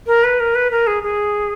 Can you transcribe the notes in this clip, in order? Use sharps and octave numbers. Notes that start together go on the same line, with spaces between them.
A#4
B4
A#4
B4
A#4
G#4
G#4